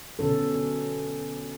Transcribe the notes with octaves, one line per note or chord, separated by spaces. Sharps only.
B2 D3 C#4 A4